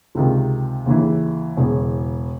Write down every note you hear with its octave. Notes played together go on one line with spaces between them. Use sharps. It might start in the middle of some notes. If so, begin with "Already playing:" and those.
C#2 C3 D#3 G#3
D#2 C#3 E3
E1 E2 C#3